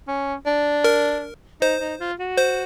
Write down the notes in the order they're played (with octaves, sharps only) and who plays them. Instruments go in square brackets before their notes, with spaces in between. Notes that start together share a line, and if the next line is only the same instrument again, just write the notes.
[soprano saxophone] C#4
D4
[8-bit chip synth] A#4
[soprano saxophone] D#4 [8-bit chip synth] C5
[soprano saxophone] D#4
F4
F#4
[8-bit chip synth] C5